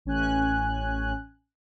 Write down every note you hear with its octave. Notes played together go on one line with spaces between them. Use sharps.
A1 C#4 G#5 F#6